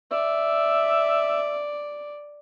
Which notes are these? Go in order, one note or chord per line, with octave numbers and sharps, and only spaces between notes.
D5 E5